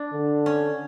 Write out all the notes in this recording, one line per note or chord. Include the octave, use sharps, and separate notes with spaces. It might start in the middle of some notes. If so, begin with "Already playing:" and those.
Already playing: D4
D3
C#4